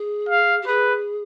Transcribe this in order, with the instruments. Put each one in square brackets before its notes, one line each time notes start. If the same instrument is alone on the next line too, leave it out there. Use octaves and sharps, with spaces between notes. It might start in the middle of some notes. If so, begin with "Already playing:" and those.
Already playing: [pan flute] G#4
[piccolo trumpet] F5
[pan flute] G4
[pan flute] G#4 [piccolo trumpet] B4